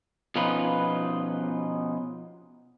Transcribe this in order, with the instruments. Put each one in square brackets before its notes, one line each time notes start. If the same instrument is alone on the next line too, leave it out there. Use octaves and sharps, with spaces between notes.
[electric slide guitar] B2 F3 C#4 D#4 F4 B4